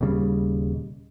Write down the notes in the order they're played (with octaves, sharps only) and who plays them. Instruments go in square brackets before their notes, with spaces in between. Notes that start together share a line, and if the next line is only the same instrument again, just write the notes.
[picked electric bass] D#1 D#2 C#3 G3